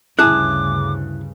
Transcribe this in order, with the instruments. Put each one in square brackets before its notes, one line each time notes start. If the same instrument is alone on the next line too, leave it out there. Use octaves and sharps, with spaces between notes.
[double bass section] D2 G2 C#3 [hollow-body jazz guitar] E4 G#4 A5 [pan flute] D6 [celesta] F#6